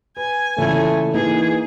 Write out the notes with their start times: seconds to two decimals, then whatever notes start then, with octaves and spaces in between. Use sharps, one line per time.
0.17 B4 G#5
0.58 A#2 C#3 E3 A3
1.14 E3 A#3 D#4 G#4